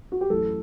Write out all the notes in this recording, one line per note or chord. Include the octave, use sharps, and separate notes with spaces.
F#4
G4
F#2 E3 A3 A4